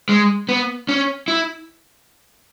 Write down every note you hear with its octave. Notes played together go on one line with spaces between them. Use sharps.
G#3
B3
C#4
E4